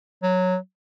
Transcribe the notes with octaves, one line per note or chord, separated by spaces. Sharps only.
F#3